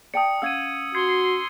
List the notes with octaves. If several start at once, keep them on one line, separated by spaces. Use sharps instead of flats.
D5 G5 A5 D#6 C#7
C#4 F5 F#5 E6 G#6 D#7
F#4 C6 G#6 C7 C#7